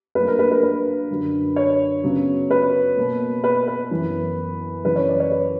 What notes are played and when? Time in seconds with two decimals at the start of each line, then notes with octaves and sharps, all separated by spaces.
0.15 G2 F#3 A#3 B4
0.28 A#4
0.39 B4
0.51 B4
0.63 B4
1.10 F#2 D3 F#3
1.56 C#5
2.04 C#3 F#3 B3
2.51 B4
2.96 B2 A#3
3.44 B4
3.67 B4
3.91 F#2 E3 B3
4.84 F#2 C#3 E3 B4
4.96 C#5
5.08 D5
5.20 C#5
5.32 B4